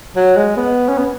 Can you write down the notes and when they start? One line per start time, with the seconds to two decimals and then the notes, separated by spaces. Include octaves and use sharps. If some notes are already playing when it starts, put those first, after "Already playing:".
0.16 F#3
0.37 G#3
0.57 B3
0.89 C#4
0.98 B3